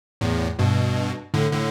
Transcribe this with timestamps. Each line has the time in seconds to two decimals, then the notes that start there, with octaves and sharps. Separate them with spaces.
0.21 E2 A2
0.59 G2 B2
1.34 A2 D3
1.52 A2 D3